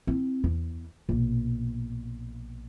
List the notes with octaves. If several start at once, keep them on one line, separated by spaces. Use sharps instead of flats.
C4 E4
E2
A#1 B2